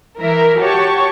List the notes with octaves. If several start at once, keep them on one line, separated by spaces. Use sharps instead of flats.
E3 A#4 E5
F#4 G4 C#5 A5 C#6